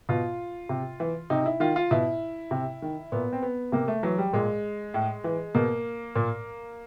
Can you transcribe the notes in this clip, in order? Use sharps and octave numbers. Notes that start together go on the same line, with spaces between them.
B2 F4
C3
E3
C3 D#4
E4
D#3 F4
F4
B2 E4
C3
D#3
A#2 B3
C4
B3
C3 A#3
A3
E3 F#3
G3
A#2 G#3
A2
E3
B2 A#3
A#2